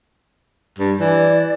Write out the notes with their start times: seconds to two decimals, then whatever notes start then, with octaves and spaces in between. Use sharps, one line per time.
0.79 G2
1.00 E3 D5